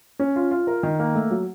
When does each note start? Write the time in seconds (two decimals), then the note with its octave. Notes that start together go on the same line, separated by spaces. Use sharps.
0.19 C#4
0.36 F4
0.51 F4
0.67 A#4
0.83 D#3
0.99 A#3
1.15 A3
1.31 F#3